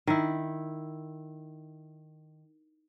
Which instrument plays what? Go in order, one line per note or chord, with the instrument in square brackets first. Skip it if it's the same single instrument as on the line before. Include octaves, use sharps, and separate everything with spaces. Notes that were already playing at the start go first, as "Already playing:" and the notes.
[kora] D#3 E4